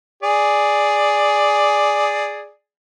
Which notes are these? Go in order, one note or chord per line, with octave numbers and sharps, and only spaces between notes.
G#4 D5